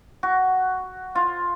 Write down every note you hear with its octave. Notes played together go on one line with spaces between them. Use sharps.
F#4
F4